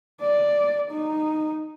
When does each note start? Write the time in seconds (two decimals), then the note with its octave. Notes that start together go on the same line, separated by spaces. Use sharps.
0.21 D5
0.91 D#4